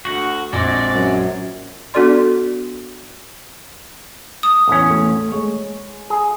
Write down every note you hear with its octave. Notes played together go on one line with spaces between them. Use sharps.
D2 F#4 F#5
A#1 G#3 C4 F#4 D5
F#2
B3 D4 F#4 A4 D5 C6
D#6
A1 E2 C#4
A3
G#3 C#5
G#4